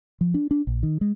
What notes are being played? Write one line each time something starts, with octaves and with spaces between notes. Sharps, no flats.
F3
D4
D4
A#1
D#3
G#3